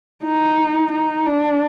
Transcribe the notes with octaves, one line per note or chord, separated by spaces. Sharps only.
D#4
D#4
D4